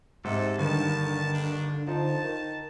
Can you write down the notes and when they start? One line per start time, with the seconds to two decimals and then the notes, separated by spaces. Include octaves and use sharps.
0.24 G#2 C3 A4
0.58 G2 D3 D#3 A#3 A5
1.33 D4
1.87 F3 D#4 A5
2.24 D#3